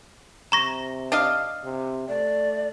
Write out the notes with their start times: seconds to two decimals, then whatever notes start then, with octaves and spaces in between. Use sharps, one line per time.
0.52 C3 A#5 C#6 A#6
1.12 D4 D#5 F5
1.64 C3
2.08 A3 D5